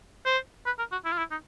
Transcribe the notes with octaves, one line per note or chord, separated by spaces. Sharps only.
C5
B4
A#4
F#4
E4
F4
E4
D#4